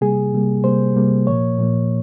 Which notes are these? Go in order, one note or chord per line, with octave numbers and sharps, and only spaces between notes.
C3 G3 A#3 G#4
C3 G3 A#3
C3 G3 A#3 C5
C3 G3 A#3
A#2 F3 A#3 C#5
A#2 F3 A#3